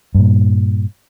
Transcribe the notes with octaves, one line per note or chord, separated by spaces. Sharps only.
G2 A#2